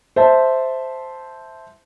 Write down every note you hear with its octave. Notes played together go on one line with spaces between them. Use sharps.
C5 E5 A5